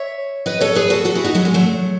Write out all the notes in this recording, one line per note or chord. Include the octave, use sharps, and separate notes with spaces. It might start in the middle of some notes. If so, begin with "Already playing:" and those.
Already playing: C#5 E5
B4 D#5
A4 C#5
G#4 B4
F#4 A4
F#4 A4
E4 G#4
D#4 F#4
F#3 A3
G#3
F#3 A3